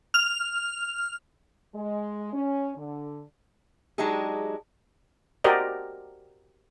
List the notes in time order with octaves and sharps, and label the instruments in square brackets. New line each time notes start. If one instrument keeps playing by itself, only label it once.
[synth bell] F6 F7
[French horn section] G#3
C#4
D3
[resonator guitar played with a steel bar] F#3 G#3 D4 D#4 G4 G#4
[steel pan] F#4 G4 A#4 C5 D5 D#5